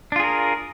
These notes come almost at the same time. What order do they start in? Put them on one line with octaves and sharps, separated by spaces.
D4 F4 G#4 A#4